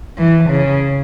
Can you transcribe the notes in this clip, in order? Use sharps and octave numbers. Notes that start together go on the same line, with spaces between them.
E3
C#3